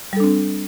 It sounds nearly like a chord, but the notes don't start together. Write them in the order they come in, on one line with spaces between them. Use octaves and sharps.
G3 A4 D4 C4